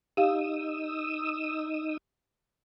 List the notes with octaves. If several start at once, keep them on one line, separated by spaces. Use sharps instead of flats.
D#4 G4 F5 D#6 E6